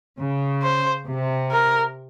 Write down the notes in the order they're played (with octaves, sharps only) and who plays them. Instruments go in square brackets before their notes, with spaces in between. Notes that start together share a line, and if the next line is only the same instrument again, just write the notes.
[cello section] C#3
[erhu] C5
[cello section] C3
[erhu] A#4